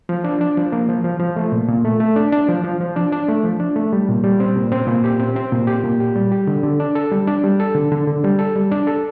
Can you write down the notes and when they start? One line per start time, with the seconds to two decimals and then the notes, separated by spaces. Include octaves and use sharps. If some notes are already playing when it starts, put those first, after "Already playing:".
0.09 F3
0.24 D4
0.41 D4
0.57 F3
0.72 A#3
0.89 F3
1.04 F3
1.20 F3
1.36 A3
1.52 A#2
1.68 A#2
1.85 A3
2.00 A3
2.16 D4
2.32 D4
2.48 F3
2.64 F3
2.80 F3
2.96 D4
3.12 D4
3.29 A3
3.44 F3
3.60 D4
3.76 A3
3.93 G3
4.09 A#2
4.24 G3
4.40 C4
4.56 A#2
4.72 C4
4.87 A#2
5.04 G4
5.20 C4
5.36 C4
5.52 A#2
5.67 G4
5.84 A#2
6.00 G4
6.16 G3
6.32 G4
6.47 D3
6.63 D3
6.80 D4
6.95 A4
7.12 G3
7.27 D4
7.44 G3
7.60 A4
7.75 D3
7.92 D3
8.07 D3
8.24 G3
8.39 A4
8.56 G3
8.71 D4
8.87 A4